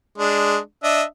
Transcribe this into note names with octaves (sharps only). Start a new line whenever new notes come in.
G#3 D4
D4 D#5 E5